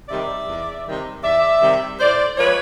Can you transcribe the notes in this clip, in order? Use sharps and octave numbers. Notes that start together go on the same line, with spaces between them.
C3 D#3 G3 D5 E5
E2
C3 D#3 G3
E2 D5 E5
C3 D#3 G3
A2 C5 D5
F3 G#3 B4 C#5